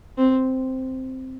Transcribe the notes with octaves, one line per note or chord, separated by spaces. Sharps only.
C4